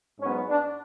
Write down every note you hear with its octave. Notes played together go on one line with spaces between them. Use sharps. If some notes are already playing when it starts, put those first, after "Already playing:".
G#2 F#3 B3 C#4
D4